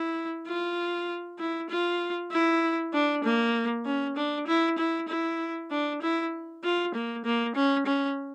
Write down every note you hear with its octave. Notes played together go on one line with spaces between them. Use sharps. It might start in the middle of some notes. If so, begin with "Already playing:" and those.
Already playing: E4
F4
E4
F4
E4
D4
A#3
C#4
D4
E4
E4
E4
D4
E4
F4
A#3
A#3
C#4
C#4